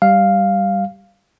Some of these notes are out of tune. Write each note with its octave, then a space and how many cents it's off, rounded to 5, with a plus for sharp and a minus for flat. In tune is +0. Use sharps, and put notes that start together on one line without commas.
G3 +0 F5 +0